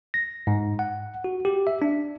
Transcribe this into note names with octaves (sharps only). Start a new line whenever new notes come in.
A#6
G#2
F#5
F#4
G4
E5
D4